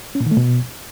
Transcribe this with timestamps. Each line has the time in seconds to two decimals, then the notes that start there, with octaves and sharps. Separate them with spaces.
0.15 C#4
0.20 A#2
0.26 D#3
0.31 A3
0.37 B2